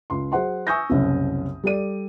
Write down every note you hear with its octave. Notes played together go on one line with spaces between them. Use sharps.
C#2 C6
F#3 G#4 C5 F#5 C6
G#5 C#6 D#6 E6 G6 A#6
F#1 C2 C#4
G3 A4 D5 D#7